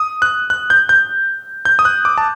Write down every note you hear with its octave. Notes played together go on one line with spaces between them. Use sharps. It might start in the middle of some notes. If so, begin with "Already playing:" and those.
Already playing: D#6
F#6
F#6
G6
G6
G6
D#6
F#6
D6
A5